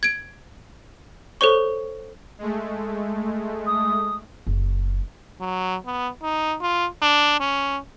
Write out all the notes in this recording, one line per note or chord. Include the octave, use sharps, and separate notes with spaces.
G#6 D7
A4 C5 C#5 C#6
G#3 A3
D#6
F#1
F#3
B3
D#4
F4
D4
C#4